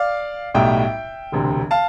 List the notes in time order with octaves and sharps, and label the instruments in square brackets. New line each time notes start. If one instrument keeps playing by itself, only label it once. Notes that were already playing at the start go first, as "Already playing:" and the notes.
Already playing: [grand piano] D5 F5
B1 A2 G3 E5 G5
E1 D2 C3
F5 A5